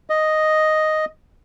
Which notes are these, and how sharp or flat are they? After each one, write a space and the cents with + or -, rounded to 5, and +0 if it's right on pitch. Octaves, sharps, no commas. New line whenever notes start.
D#5 +0